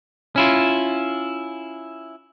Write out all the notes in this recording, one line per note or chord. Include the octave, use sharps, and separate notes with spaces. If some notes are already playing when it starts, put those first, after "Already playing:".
C#4 E4 F4